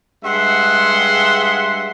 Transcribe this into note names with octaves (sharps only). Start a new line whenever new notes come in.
G2 G#3 G4 E5 F#5 C6